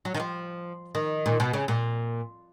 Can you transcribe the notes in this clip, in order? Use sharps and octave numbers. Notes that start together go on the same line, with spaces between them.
F#3
D#3
F3
D#3
A#2
B2
C#3
A#2